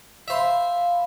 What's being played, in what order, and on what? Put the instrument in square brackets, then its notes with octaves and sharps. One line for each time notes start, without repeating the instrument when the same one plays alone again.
[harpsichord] C5 E5 [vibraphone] F5 B5